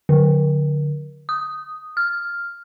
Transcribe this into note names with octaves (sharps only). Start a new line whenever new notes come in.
D3
D#6
F6